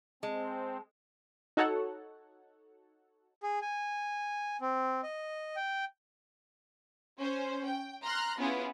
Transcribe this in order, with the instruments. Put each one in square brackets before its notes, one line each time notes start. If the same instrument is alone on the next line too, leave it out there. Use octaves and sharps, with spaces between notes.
[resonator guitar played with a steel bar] G#3 [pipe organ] C4 [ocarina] A5
[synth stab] D#4 F#4 A4 C#5 F#5
[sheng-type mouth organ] G#4
G#5
C4
D#5
G5
[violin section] C#4 C5
G5
A#5 C6 F6 F#6
B3 C#4 E4 F4 G#4